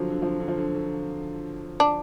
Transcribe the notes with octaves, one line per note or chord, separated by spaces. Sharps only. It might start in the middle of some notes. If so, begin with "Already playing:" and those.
Already playing: D3 F3 F#3
D3
F3
D3
F3
D3
D3
D4